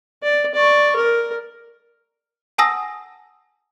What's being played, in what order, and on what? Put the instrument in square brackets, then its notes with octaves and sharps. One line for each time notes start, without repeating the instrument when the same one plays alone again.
[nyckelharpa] D5
D5 C#6
A#4
[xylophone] F#5 G#5 A5 D#6 E6 A#6